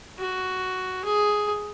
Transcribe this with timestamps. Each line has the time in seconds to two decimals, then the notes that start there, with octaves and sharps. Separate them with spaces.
0.19 F#4
1.04 G#4